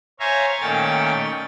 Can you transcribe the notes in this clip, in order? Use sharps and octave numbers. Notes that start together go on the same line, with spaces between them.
C5 C#5 E5 F5 G#5 A#5
A#2 D#3 A3 C#4 G5 A6